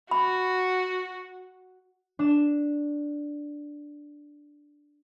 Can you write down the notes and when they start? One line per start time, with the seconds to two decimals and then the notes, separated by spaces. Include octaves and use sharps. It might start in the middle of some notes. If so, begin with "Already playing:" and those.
0.11 F#4 B5
2.19 D4 E7